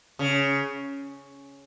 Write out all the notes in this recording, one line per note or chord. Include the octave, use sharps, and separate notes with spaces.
C#3